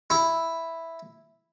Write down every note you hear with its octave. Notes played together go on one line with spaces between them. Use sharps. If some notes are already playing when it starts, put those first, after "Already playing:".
E4